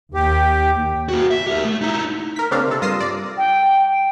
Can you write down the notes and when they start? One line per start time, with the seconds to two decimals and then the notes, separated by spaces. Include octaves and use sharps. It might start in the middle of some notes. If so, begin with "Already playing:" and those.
0.14 D#2 G4
1.09 A#3 F#4
1.31 E5
1.46 G4 A#4
1.64 A3
1.81 D#4 E4
2.36 A#4 B6
2.51 C#3 A#3 C4 D4 F5
2.67 C3 A4
2.81 G2 F4 D#6 A#6 C7 E7
3.00 D5
3.38 G5